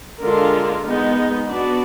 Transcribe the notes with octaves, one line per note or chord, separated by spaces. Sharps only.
D3 G#3 D4 F4 A#4
G#3 B3 D#4
B3 D4 F#4 B4 D5